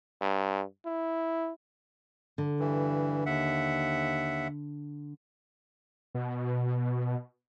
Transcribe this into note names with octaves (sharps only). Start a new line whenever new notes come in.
G2
E4
D3
G2 E3
D#2 E5 F#5
B2